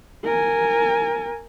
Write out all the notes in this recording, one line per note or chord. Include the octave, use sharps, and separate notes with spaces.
A#4 G#5